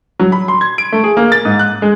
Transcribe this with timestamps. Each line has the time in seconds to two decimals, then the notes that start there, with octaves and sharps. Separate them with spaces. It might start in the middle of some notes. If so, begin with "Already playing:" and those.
0.19 F#3
0.32 B5
0.48 C6
0.61 G#6
0.78 D7
0.92 A3
1.04 G#4
1.17 A#3
1.32 A6
1.45 G#2
1.59 F#6
1.82 G#3